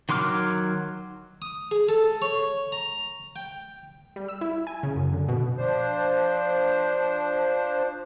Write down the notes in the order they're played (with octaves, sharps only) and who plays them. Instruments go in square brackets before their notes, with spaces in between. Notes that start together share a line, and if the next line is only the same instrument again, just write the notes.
[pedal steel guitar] D#3 F#3 C6 D6 F6
[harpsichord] D#6
G#4
A4
C#5
A#5
G5
[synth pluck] G3
E6
E4
G#5
C#3
F#2
D3
B2
[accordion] F3 D4 C5